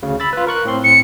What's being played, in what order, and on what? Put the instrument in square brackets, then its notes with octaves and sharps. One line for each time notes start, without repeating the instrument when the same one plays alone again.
[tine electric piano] D2 C#3
B5 E6 A6
F4 B4
A#4 C#6 F#6
A2 C4 C6
[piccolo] C#7